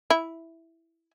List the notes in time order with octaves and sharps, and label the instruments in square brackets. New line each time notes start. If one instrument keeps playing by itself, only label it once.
[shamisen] E4